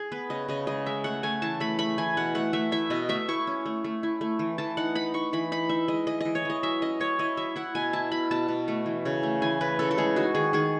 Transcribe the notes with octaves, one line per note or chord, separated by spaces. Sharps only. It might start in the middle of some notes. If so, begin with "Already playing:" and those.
Already playing: G#4
B3 B4
C#3 D#5
C#3 D#5
G#3 D#5
G#3 E5
A3 F#5
A3 G#5
E3 A5
A3 B5
A3 B5
E3 G#5
B2 F#5
A3 F#5
A3 E5
E4 E5
B2 D#5
A3 E5
E4 C#6
C#4
A3
A3
E4
A3
E3
E3 A5
D#4 F#5
D#4 B5
D#4 C#6
E3 B5
D#4 B5
D#4 E5
G#3 D#5
E3 D#5
E3 D#5
C#5
E3 D#5
F#3 E5
C#4 D#5
C#4 C#5
E4 D#5
F#3 E5
E4 F#5
B2 G#5
E4 A5
B2 B5
B2 A5
B2
A3
E3
C#3
A3
E3 G#5
C#3 B4
C#3 A4
A4
G#3 G#4
D#4 F#4
D#3 G#4
D#3 G#4